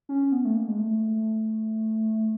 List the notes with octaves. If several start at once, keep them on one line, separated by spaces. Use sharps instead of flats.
C#4
B3
A3
A#3
G#3
A3